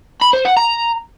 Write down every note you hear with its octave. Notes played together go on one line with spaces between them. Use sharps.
B5
C5
F#5
A#5